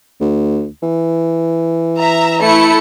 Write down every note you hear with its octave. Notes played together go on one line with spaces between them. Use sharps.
D2
E3
E5 A#5
A3 E4 C#7